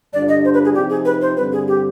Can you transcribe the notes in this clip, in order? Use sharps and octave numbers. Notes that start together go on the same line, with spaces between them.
G2 D3 G3 D4 F4 D5
D#5
C5
B4
G#4
C3 F3 C4 D#4 G4
G#4
B4
C5
G2 D3 G3 C4 B4
G#4
G4